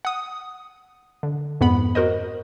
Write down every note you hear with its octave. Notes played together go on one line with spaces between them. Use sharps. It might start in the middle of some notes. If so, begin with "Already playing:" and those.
F#5 D#6
D3
F2 G#2 B3 F#5 B5
F#4 A#4 C5 D#5